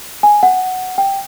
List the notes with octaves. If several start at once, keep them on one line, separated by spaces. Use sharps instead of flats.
G#5
F#5
G5